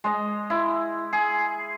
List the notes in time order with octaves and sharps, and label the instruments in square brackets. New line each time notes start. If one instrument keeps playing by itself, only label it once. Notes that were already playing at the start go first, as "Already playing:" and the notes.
[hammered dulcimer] G#3 D#5
E4
G#4